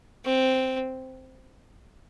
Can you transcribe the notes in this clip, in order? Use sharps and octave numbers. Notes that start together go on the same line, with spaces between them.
C4